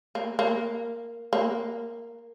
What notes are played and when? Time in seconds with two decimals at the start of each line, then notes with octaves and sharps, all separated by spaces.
0.15 A#3
0.39 A#3
1.33 A#3